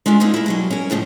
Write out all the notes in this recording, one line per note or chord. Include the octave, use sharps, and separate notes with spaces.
G#3 C#4 D4 F4
G#3 A#3 B3 D#4 G#4 A4
A#3 E4
B2 F#3 G3
C#4 A#4
F2 A2 C#3 F3